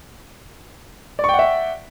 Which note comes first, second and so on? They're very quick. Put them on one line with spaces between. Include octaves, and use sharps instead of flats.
D5 C#6 G5 F#5 E5